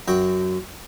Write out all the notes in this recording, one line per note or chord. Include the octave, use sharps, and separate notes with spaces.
F#2 F#4 G5